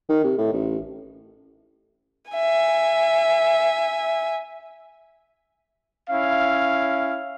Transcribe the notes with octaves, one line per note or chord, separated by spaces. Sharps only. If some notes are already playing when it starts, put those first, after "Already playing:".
D#3
C3
A2
A1
E5 G#5
C#4 E4 F5